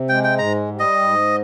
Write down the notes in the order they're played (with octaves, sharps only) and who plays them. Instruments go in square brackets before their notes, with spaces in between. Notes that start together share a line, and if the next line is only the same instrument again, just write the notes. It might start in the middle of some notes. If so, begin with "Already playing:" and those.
Already playing: [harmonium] C3
[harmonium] G#3 [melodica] G5
[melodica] G5
[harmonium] G#2 [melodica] A#5
[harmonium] G3
[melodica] D#5
[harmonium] G#2